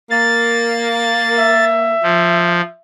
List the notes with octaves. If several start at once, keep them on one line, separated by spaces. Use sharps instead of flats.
A#3 A6
E5
F3